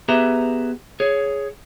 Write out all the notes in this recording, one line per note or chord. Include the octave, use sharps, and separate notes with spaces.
B3 G4 G#4 B4 E5 A#5
G#4 C#5